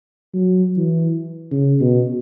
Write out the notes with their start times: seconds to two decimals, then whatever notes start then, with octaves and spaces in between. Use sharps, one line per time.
0.33 F#3
0.77 E3
1.51 C#3
1.81 B2